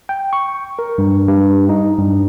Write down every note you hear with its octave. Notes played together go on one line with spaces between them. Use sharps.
G5
C#6
A#4
G2
G2
D#4
G2